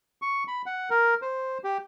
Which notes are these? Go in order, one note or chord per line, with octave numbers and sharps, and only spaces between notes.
C#6
B5
F#5
A#4
C5
G4